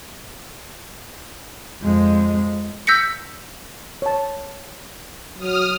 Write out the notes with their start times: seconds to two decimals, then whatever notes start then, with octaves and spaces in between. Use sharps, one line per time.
1.82 F2 G#3
2.87 E6 G6 A#6 B6 C#7
4.02 C#5 A5
5.39 F#3 D#6 F6